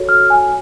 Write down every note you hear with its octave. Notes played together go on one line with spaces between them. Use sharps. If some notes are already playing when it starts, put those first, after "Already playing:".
Already playing: F#4 A4 C#5
F6
G#5